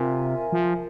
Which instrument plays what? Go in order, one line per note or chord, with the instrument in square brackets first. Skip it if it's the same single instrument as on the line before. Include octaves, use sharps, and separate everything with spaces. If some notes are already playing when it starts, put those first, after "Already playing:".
Already playing: [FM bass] C3 [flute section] F4 A#4 E5 G#5
[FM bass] F3